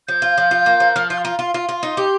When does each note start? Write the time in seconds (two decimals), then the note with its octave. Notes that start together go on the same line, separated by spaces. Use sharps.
0.08 F3 G6
0.22 F4
0.38 F3
0.51 F4
0.66 A#3
0.80 F3
0.96 F3 F6
1.10 F4 G6
1.18 C6
1.25 F4 A#5
1.39 F4 C6
1.54 F4
1.69 F4
1.83 D#4
1.97 G4